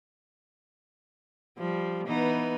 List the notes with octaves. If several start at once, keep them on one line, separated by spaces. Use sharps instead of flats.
F3 G3
E3 B3 D#4